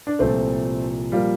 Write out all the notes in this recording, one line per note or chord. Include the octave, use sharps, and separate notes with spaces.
D4
C2 A#2 F3 A3 C4
A#2 F3 G3 A#3